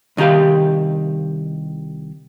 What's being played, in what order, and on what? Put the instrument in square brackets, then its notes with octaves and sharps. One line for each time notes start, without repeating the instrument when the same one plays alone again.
[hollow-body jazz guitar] C2 D#3 D#4 G4 F5